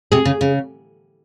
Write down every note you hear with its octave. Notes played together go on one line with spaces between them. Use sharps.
C3 G#4
C#3
C#3